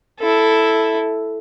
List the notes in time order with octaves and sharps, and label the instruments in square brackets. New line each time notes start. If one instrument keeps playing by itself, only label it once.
[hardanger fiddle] E4 A4